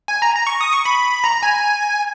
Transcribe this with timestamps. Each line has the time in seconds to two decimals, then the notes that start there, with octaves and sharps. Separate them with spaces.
0.08 G#5
0.22 A#5
0.35 A#5
0.47 C#6
0.61 D#6
0.73 C#6
0.85 B5
1.24 A#5
1.43 G#5